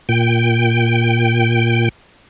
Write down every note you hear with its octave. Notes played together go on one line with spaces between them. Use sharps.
A#2 G5